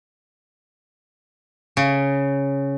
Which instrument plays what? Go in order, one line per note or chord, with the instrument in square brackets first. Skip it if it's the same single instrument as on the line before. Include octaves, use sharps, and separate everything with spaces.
[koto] C#3